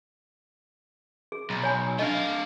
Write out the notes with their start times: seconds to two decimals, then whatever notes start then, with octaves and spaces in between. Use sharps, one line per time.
1.32 G#4
1.50 B1
1.63 C#5 G#5 B5
1.99 A3 D4 D#5 F5